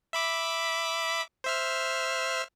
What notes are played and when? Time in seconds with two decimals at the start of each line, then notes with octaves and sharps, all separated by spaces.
0.13 E5 B5 D6
1.44 C5 E5 F6